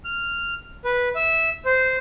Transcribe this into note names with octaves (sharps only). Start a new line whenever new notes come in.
F6
B4
E5
C5